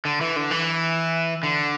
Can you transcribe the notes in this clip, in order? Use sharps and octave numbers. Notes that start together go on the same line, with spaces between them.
D3
E3
D3
E3
D3